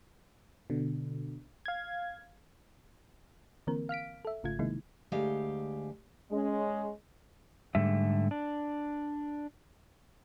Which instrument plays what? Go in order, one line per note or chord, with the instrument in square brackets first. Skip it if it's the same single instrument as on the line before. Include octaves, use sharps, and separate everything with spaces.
[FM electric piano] B2 D3
F5 G#6
[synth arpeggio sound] D3 E3 A#3 C4 A#4
F5 F6 B6 D7
A4 E5
G#1 G#2 C#3 A3 F4 G#6
C3 D#3 G#3 A#3 D#4 E4
[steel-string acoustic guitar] D2 G#3 G4 F5
[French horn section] G#3 C#4
[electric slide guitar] G#2 D3 G3 A3 E5
D4